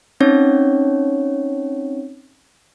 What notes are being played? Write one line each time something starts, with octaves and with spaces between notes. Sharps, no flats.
C4 C#4 D#4 C#5